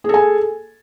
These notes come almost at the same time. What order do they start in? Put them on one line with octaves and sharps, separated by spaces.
G#4 A4 G#5